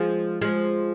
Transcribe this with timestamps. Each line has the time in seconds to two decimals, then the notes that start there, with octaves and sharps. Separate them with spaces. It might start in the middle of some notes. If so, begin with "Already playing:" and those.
Already playing: F3 G#3
0.41 F3 G#3